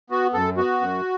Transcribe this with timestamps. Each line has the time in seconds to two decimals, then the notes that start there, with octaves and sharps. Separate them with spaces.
0.10 B3 F#4
0.33 F#2 A4
0.57 B3 F#4
0.81 F#2